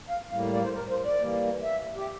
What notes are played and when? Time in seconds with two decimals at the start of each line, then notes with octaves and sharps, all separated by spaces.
0.10 F5
0.31 A2 G3 A#3 F5
0.53 D5
0.64 C5
0.75 A#4
0.90 C5
1.05 D5
1.19 E3 G3 A#3
1.63 E5
1.96 G4